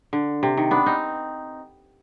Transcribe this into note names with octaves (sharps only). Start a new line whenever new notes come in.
D3
C3
D#3
B3 D4
C4 D#4